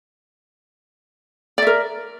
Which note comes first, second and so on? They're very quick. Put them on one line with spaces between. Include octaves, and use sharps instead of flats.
D5 E5 A#4